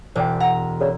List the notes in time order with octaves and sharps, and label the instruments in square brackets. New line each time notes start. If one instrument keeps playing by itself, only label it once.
[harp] E1 D6 [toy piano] C5 D5 G5
[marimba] F#5 [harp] A#5
[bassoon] C#3 [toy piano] A4 A#4 D5